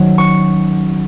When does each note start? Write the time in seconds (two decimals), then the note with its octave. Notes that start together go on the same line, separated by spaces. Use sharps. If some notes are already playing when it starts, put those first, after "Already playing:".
Already playing: D#3 F#3 C#4
0.18 C#6